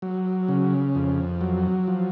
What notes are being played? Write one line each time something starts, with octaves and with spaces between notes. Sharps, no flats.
F#3
C#3
F2
F#3
F3